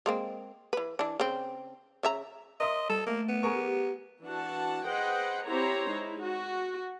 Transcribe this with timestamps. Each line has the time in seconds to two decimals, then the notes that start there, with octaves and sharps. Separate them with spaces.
0.06 G#3 A#3 C4
0.73 E3 B4
0.99 E3 D4
1.20 C#3 C4
2.03 C#3 E5 A#5
2.60 A#4 D#5 E5 C6 D#6
2.90 G3 A4 A5
3.06 A3 A#3
3.29 B3
3.43 G#4 A#4 C#6
3.56 G4
4.23 E3 D4 F#4 F#5 A5
4.86 G#4 B4 C5 D#5 F#5 G5
5.46 C4 E4 G4 C5 C#5 A#5
5.90 G#3 D#4 E4
6.22 F#4